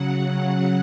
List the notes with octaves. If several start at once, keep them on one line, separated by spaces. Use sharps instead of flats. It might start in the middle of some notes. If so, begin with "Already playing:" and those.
Already playing: C#3 F#3 F#5
F#5